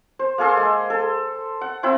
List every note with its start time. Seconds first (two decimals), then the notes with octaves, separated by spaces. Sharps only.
0.19 C5
0.38 A#3 G#4 A4 C6
0.57 G#3
0.90 A4
1.61 F#5
1.83 C4 E4 F#5 E6